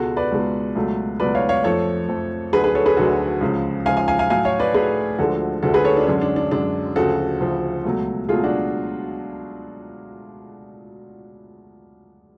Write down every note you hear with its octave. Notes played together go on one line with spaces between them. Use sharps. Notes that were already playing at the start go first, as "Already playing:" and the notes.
Already playing: C#2 B2 G#3 F#4 A4
B4 D5
C#2 B2 G#3
C#2 B2 F#3 A3
C#2 B2 F#3 A3 B4 D5
C#5 F5
C#5 F5
F2 F3 A3 A4 C#5
F2 F3 A3
D2 D3 F#3 G#4 B4
G#4 B4
A4 C#5
G#4 B4
D2 D3 F#3 F#4 A4
C#2 C#3 F3
C#2 C#3 F3 F5 G#5
F5 G#5
F5 G#5
F5 G#5
A2 F#3 A3 F5 G#5
C#5 F5
B4 D5
A2 F#3 A3 G#4 B4
D2 D3 F3 G#3 F#4 A4
D2 D3 F3 G#3 F#4 A4
G#4 B4
A4 C#5
D4
F#2 D3 G#3 C#4
D4
D4
F#2 D3 G#3 D4
D2 C#3 F3 F#4 A4
D2 C#3 F3
C#2 B2 F#3 A3
C#2 B2 F#3 A3 F4 G#4
D4 F#4